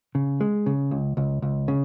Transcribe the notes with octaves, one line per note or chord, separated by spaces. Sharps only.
C#3
G#3
C#3
C#2
C#2
C#2
C#3